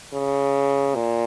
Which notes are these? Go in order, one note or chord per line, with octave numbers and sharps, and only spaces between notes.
C#3
A#2